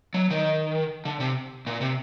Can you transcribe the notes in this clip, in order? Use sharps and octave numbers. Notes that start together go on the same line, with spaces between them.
F#3
D#3
D3
C3
A#2
C3